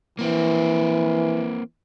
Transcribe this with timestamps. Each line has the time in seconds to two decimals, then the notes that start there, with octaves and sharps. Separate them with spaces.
0.19 E3 A#3 C4